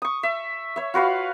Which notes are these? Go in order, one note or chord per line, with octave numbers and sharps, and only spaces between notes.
C#6 D#6
E5
C#5 E5
F4 F#4 B4 F5